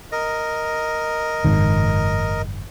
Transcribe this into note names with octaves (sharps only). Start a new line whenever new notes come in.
A#4 D#5
F#1 G#2 D#3